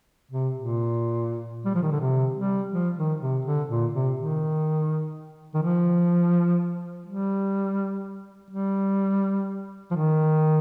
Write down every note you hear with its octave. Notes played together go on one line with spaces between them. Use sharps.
C3
A#2
G3
F3
D#3
D3
C3
G3
F3
D#3
C3
D3
A#2
C3
D#3
D#3
F3
G3
G3
F3
D#3